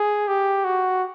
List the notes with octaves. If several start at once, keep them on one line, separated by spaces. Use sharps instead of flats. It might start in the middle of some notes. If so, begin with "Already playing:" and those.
Already playing: G#4
G4
F#4